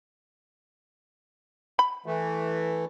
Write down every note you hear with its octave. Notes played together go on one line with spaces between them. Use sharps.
B5
E3 A3